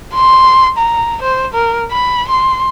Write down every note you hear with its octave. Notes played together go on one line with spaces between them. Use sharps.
C6
A#5
C5
A#4
B5
C6